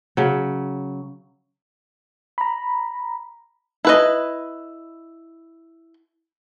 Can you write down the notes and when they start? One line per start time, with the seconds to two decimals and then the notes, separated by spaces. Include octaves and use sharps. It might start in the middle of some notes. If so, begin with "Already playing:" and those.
0.17 C#3 F#3
2.38 A#5 B5
3.85 E4 B4 D#5